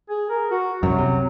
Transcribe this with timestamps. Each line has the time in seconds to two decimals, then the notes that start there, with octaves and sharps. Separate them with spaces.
0.10 G#4
0.30 A#4
0.51 F#4
0.83 C2 F#2 F#3
0.99 C3